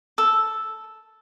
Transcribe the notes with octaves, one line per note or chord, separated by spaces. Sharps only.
A4 E6